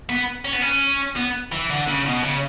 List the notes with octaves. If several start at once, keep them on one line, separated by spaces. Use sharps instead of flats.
B3
C#4
B3
C#4
B3
E3
D3
C#3
B2
C#3